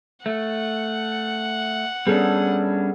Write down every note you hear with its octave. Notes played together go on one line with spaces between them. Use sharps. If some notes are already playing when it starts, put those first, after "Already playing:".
A3 F#5
G3 B3 C#4 D4 G#4 A4